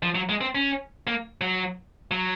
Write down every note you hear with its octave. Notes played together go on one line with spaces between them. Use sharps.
F3
F#3
G#3
C4
C#4
A#3
F#3
F#3